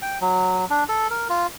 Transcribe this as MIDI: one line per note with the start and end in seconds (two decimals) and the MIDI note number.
0.02 0.18 79
0.21 0.65 54
0.70 0.84 62
0.89 1.07 69
1.10 1.28 70
1.29 1.47 65